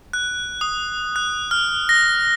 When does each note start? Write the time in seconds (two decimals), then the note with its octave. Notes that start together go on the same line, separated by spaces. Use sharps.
0.13 F#6
0.61 D#6
1.16 F#6
1.51 F6
1.89 A#6